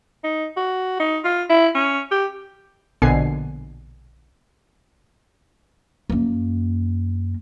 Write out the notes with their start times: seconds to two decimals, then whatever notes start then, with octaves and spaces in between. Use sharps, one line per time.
0.24 D#4
0.57 F#4
1.00 D#4
1.25 F4
1.50 E4
1.75 C#4
2.11 G4
3.02 A#1 B2 D3 G#5 C7
6.10 F#2 A#3